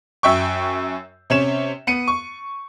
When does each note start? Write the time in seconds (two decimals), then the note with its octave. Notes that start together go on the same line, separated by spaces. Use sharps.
0.23 F#2 E5 G5 C#6
1.30 C3 C#4 C#5 E7
1.87 B3 C#7 D#7
2.08 C#6